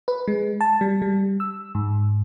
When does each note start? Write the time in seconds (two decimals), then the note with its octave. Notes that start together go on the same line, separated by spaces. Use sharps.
0.08 B4
0.28 G#3
0.61 A5
0.81 G3
1.02 G3
1.40 E6
1.75 G#2